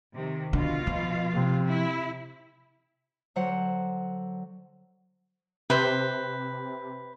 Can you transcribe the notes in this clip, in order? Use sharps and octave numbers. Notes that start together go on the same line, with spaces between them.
C3 D#3
B2 D3 F4 F5
F3
C3
E4
D3 F#3 C5 F#5
C3 B4 C5